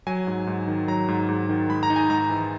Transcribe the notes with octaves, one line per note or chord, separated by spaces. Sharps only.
F#3 G#5
G#2
G#2
D#3
F#3 A#5
G#2
G#2
D#3
G#3 B5
A#5
D#4
G#5
G#2 A#5
E3